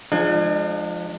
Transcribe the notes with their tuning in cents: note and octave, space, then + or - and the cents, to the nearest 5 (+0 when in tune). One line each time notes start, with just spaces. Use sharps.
F3 +0 G#3 +0 D4 +40